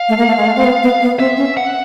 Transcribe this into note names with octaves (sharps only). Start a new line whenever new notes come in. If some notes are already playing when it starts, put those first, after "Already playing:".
Already playing: F5
A3
A#3
A3
G#3
A3
C4
B3
B3
B3
C4 E5
C#4
F#5